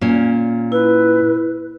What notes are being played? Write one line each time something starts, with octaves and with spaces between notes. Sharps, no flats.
A#2 C#4
E4 B4